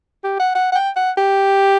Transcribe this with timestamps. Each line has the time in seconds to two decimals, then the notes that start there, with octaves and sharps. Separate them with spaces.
0.24 G4
0.40 F#5
0.55 F#5
0.72 F#5
0.75 G5
0.96 F#5
1.18 G4